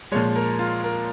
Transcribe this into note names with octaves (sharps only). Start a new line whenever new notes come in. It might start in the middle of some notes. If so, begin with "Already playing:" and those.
A#2 F3 G#3 C#5
A#4
F4
A#4